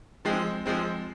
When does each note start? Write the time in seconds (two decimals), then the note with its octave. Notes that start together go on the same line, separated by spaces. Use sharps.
0.25 F3 G#3 C4
0.66 F3 G#3 C4